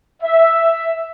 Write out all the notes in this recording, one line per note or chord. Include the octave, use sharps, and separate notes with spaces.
E5